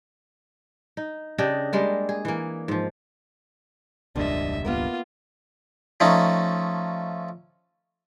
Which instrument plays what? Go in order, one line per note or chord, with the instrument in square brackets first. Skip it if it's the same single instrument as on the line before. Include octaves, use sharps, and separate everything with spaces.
[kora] D#4
C#3 D4 G4 D#5
G3 G#3 A#3
G#4
E3 A#3
G#2 F3
[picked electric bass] E1 C#2 G2 [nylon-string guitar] F3 A#3 D4 [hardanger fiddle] D#5 E5
[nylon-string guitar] A#3 B3 A#4 [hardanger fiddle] F4
[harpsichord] F3 A3 C#4 D#4